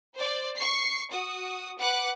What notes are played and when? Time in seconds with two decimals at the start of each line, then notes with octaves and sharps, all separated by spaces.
0.15 C5 D5
0.57 C#6 C7
1.12 F#4 D#6
1.79 B4 F#5 D6 F#6